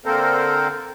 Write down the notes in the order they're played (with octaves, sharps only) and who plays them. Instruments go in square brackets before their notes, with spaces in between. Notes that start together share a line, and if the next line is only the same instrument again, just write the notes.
[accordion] D3 A#3 C4 A4 A#4 C5